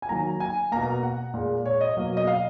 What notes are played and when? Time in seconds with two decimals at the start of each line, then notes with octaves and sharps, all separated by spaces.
0.02 G#5
0.09 D#3 F#3 A#3 A#5
0.40 G#5
0.72 B2 A#3 A#5
1.03 F#5
1.34 A#2 G#3
1.66 C#5
1.81 D#5
1.96 B2 F#3 A#3
2.17 D#5
2.27 F5